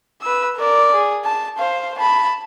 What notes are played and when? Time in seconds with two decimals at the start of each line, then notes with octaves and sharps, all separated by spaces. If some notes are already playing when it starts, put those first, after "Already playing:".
0.21 B4 E6
0.57 A#4 D5
0.94 G#4
1.24 A5
1.58 C5 F5
1.98 A5 B5